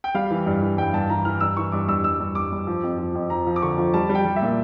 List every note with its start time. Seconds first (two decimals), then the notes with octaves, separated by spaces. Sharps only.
0.04 G5
0.14 G3 F5
0.31 E3
0.46 G2
0.62 E3
0.77 G2 G5
0.93 G2 A5
1.10 E3 A#5
1.25 E3 F6
1.40 G2 E6
1.57 E3 C#6
1.72 G2 D6
1.88 G2 E6
2.04 G2 E6
2.20 G2
2.35 G2 D6
2.52 G2
2.67 F3
2.83 F2
2.98 F3
3.15 F2
3.30 F3 A#5
3.46 F3
3.56 D6
3.62 D3 C#6
3.78 F3
3.94 G3 A5
4.09 G3
4.15 G5
4.25 G3
4.36 E5
4.42 A#2